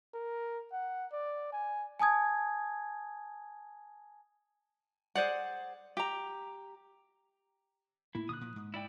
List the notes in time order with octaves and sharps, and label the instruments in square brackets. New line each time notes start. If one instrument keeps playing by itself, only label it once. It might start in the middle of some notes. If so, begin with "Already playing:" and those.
[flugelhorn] A#4
F#5
D5
G#5
[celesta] G#5 A5 D#6 G#6
[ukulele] G#4 C5 D5 F#5
G4 A#5
[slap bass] A2 A#3 [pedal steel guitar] E4
[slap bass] A#2 D3 D#3 [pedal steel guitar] D#6 F#6
[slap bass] A#2 F3
G#2
[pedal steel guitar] E4 D5 G5